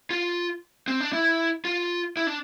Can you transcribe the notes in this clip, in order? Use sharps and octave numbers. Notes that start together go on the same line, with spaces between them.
F4
C4
D4
E4
F4
E4
D4